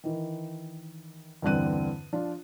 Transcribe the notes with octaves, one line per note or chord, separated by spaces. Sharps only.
D#3 E3
E2 G2 D3 C4 F#6 D#7
F3 D4 F4